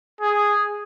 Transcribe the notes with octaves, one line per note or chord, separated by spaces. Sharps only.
G#4